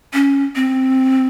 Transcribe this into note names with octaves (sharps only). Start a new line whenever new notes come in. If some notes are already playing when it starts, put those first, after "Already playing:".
C#4
C4